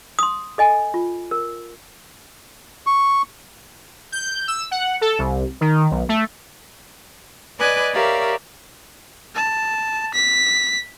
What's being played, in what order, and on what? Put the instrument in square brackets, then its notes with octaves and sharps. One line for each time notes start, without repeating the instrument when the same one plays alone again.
[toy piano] C6 D#6
A4 D#5 G#5
F4
A#4
[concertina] C#6
[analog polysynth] G6
E6
F#5
A4
C2
D#3
B1
A3
[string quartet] B4 D5 D#5 G#5 D6 F#6
G4 A#4 C#5 D5 E5 F5
[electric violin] A5
B6